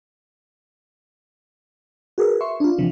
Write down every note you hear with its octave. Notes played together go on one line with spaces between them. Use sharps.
F#4 G#4 A#4 B4
E5 C6 C#6
D4 F4
C3 E3 F3